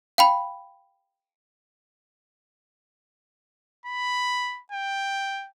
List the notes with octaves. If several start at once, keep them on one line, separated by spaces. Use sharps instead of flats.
F5 G5 B5
B5
G5